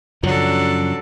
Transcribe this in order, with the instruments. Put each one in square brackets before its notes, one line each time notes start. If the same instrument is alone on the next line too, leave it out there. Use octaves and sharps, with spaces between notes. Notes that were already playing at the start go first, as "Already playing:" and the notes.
[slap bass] F#2 C#3 F3 [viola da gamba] F#3 D4 A4